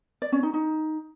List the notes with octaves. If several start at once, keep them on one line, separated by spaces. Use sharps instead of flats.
D5
C#4
D#4
D#4